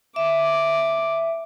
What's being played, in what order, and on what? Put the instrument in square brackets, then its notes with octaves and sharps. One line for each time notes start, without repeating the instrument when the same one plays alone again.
[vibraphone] E5 [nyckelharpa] D6